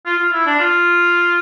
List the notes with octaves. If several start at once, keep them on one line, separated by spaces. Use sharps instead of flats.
F4
F4
E4
D4
F4